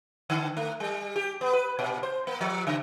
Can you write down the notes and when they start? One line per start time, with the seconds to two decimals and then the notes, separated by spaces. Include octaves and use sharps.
0.30 D3
0.57 A3
0.80 G3
1.16 G4
1.41 B3
1.53 B4
1.79 A#2
2.03 C5
2.27 A#3
2.41 F3
2.67 C#3